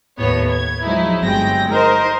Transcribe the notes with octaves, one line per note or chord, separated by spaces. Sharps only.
D#2 A2 B3 C#5
G#6
F3 F#3 G#3 D#4 E4
G1 F#3 G#3 C4 G5 A#6
D#4 A#4 C5 D#5